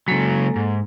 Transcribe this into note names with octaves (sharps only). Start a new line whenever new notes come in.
C#3 F#3 G#3 A#3 A4
G#2